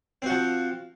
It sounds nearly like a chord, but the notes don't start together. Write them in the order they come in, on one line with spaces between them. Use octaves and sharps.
C4 F#4 F3